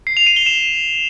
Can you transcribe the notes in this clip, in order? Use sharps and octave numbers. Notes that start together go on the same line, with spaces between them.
C7
F7
D#7
G7
E7